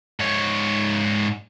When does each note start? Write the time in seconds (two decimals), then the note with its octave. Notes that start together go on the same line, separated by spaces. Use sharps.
0.20 G#2 C#5